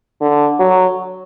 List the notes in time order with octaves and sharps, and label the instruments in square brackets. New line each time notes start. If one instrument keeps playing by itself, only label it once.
[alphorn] D3
F#3